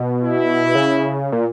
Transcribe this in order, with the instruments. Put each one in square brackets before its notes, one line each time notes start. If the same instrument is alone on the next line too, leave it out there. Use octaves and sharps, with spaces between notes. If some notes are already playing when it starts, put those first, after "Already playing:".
Already playing: [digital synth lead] B2
[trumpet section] E4
[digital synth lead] C#3
A#2